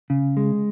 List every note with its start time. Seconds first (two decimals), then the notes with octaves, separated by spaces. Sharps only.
0.10 C#3
0.37 G#3